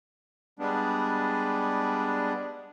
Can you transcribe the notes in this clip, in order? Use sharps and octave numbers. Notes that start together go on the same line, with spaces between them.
G3 G#3 B3 D4